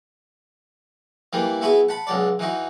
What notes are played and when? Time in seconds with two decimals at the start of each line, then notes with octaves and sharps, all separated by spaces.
1.33 E3 G3 A#3
1.61 B3 E4 F#4 G#4 B4
1.89 F#5 A5 B5
2.07 C#2 F#3 D5
2.39 E3 D#4 F#4